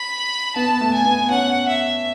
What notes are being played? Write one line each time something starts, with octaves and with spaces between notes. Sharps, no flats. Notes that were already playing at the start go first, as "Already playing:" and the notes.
Already playing: B5
B3 A5
A3
G#5
B3
C#4 F#5
E5